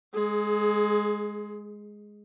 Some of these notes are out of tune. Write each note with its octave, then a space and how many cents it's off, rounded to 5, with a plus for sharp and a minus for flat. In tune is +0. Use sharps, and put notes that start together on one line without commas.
G#3 +0 G#4 +30